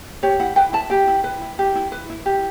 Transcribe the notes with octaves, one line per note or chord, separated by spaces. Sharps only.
G4 C#5
E4 F#5
B4 G5
E4 A5
G4 G5
E4
B4
E4
G4
E4
B4
E4
G4